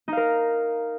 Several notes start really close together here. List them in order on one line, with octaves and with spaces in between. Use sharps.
D#4 F5 A#4